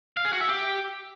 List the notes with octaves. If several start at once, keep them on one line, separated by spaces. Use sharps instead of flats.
F5
G#4
F#4
E5
G4